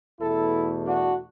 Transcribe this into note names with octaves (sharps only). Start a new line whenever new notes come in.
E2 B2 A3 E4 A4
D4 F#4